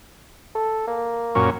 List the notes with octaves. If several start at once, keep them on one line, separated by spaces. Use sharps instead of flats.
A4
A#3
F#2 A#2 C#4